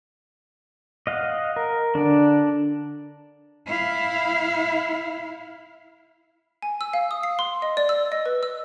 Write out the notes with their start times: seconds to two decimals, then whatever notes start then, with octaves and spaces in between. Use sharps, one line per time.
1.07 D#5 F5 F#5
1.56 A#4
1.95 D3 D4 D5
3.66 E4 F5
6.62 G#5
6.81 E6
6.93 F5
7.11 D#6
7.23 C7
7.39 C6
7.62 D#5
7.77 D5
7.89 E6
8.12 D#5
8.26 B4
8.43 E6